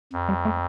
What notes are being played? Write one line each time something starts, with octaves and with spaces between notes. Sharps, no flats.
F2
G3
A3